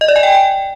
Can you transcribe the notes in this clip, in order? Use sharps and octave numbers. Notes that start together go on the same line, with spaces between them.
D#5
D5
G#5
G5